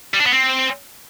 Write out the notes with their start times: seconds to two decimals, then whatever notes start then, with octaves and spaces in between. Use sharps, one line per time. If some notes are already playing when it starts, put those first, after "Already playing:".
0.14 G3
0.20 D4
0.26 B3
0.32 C4